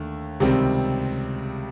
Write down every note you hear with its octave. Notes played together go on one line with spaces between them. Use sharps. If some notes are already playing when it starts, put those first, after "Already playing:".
Already playing: D#2 D3 A3
C#2 C3 D#3 G3 C4